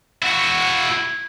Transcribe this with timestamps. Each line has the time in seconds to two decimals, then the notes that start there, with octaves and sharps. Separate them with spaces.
0.22 E4 F#4